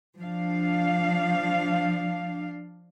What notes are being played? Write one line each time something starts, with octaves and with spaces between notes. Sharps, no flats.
F3 D4 F5